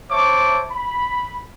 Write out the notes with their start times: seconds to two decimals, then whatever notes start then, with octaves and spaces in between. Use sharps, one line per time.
0.11 C5 C#5 E5 A5 C#6 D6
0.70 B5